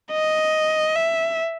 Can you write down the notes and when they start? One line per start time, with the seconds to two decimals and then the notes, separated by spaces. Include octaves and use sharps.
0.12 D#5
0.96 E5